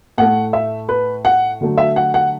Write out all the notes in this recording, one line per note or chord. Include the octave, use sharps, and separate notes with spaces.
A2 A3 F#5
E5
B4
F#5
D3 F#3 A3
E5
F#5
F#5